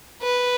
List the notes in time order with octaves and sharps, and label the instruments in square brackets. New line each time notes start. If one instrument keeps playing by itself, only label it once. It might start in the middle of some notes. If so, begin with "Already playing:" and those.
[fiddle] B4